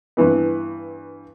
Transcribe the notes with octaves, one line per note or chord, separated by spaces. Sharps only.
G2 E3 B3